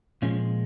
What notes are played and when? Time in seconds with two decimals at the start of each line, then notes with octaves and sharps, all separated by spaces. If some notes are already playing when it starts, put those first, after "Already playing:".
0.22 A#2 F3 G#3 C#4